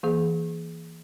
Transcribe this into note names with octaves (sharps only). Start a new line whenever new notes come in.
E3 A#3 G#4